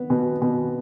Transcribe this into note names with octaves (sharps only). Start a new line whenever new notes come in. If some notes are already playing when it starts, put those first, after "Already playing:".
Already playing: B3
B2
B2